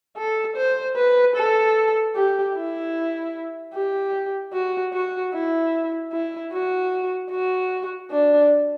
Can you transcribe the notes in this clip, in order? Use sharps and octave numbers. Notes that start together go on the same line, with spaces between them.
A4
C5
B4
A4
G4
E4
G4
F#4
F#4
E4
E4
F#4
F#4
D4